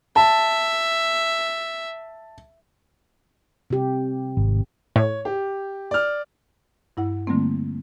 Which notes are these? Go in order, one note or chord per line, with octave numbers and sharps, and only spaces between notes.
E5 A5
C3 G4
G#1
A2 C#5
G4
D5 F6
G2 E4 F#5
D3 G3 A3 A#3 C4